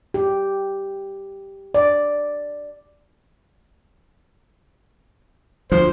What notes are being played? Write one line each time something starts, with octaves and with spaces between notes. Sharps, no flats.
G4
D5
D2 F3 C5